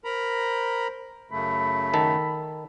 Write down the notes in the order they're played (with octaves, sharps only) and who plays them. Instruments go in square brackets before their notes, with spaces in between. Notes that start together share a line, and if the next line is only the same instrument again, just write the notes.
[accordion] A#4 A#5 B5 [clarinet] C5
[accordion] F#2 C#3 A3 [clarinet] B5
[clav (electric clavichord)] D#3 A4